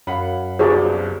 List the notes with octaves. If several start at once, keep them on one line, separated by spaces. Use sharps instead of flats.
F#2 F5 F#5 B5
G1 C2 G2 F#4 G#4 C5 D5 A5